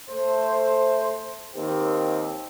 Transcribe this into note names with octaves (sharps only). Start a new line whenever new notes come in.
A3 C5
D#2 D#3 C4 G4